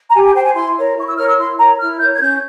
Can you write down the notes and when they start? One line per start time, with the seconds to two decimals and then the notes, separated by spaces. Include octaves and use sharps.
0.08 A#5
0.14 G4 G#5
0.24 G#5
0.34 C5 G5
0.45 G#5
0.55 E4 C6
0.76 A#4 C#5
0.96 E4 C#6
1.07 E6
1.17 A#4 C#5 F6
1.27 E6
1.38 E4 C6
1.58 A#4 C#5 A#5
1.79 E4 F6
1.99 A#4 C#5 G6
2.14 G#6
2.20 C#4 G6